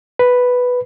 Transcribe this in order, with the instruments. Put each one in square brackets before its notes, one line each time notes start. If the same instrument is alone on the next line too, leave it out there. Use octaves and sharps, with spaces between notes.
[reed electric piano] B4